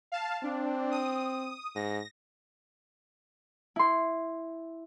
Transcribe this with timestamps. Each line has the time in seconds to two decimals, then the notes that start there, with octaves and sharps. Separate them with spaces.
0.12 F5 A5
0.44 C4 D4
0.91 D#6
1.75 G#2 A#6
3.76 E4 C6